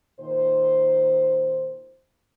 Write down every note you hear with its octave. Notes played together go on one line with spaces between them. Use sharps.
A#2 D#3 C5